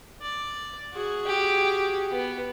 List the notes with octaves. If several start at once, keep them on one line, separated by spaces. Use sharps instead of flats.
D5
F#4 G#4
G4
B3